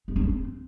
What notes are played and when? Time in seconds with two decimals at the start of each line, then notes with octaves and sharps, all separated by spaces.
0.08 D#4
0.16 D4
0.24 C4